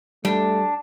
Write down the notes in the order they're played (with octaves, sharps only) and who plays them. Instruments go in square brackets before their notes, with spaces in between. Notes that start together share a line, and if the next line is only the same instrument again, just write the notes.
[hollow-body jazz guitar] G3 [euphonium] A3 [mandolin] D4